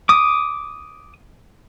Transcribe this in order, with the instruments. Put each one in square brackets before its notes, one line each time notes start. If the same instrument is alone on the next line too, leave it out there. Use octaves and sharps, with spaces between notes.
[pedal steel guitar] D6 D#6